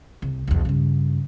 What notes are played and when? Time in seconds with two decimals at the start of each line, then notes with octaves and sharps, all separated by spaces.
0.22 C2
0.47 B1 E2
0.65 G2 C#3